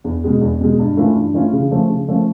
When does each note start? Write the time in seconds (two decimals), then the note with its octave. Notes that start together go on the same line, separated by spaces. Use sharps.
0.04 E2
0.24 B2 G#3
0.41 E2
0.61 B2 G#3
0.79 G2
0.97 E3 A3 C#4 F4
1.15 G2
1.34 E3 A3 C#4 F4
1.53 C#3
1.71 F3 A3 C#4
1.89 C#3
2.08 F3 A3 C#4